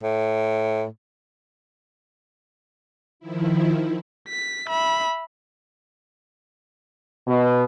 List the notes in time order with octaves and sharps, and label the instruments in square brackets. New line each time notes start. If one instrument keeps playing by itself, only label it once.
[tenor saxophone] A2
[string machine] D#3 F3 E4
[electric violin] B6
E5 B5
[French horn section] B2